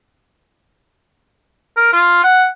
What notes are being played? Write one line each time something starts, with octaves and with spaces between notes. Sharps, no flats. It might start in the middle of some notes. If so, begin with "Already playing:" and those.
A#4
F4
F#5